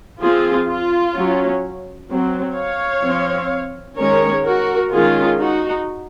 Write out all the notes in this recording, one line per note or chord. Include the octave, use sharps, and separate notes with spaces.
F3 C4 F4 G#4
F4
F#3 C#4
F#3 C4
C#5 F5
F3 C4
D#3 G#3 C#4 A#4 C#5
F#4 A#4
D#3 G#3 C#4 F4 G#4
D#4 F#4